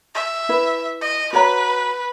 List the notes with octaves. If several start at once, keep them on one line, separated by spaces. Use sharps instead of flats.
E5
E4 B4
D#5
F#4 B4 C#5 A#5